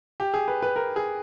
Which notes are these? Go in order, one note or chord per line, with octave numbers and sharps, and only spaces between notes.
G4
G#4
B4
B4
A#4
G#4